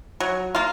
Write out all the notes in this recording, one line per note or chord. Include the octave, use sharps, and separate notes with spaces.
F#3
A#3 F4